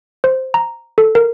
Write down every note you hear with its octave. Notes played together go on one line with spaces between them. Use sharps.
C5
A#5
A4
A#4